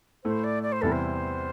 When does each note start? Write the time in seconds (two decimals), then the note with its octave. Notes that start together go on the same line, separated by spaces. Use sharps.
0.24 A2 A3 E4 C5
0.43 D5
0.62 D5
0.72 C5
0.81 E2 C3 G3 E4 A4
0.92 C5